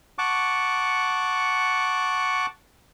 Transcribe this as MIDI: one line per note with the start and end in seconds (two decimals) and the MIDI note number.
0.18 2.46 78
0.18 2.46 81
0.18 2.46 85
0.18 2.46 86